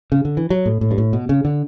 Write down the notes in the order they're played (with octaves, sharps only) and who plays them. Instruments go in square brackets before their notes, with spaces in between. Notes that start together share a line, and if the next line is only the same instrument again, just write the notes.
[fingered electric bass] C#3
D3
E3
F#3
A2
A2
G2
A2
B2
C#3
D3